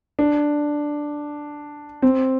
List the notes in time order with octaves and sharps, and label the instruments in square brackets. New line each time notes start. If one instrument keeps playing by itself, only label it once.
[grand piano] D4
C4